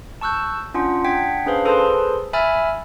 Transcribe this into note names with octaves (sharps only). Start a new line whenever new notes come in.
A5 C#6 E6 F#6 G6
C#4 D4 F4 F#5
D4 F#5 G5 G#6 B6
C#4 D4 G#4 B4 C5 F5
G#4 A4 B4 C5 A5 C6
E5 G#5 B5 E6 F6 A6